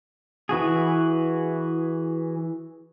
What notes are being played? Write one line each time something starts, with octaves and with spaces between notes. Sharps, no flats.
E3 F#4 G#4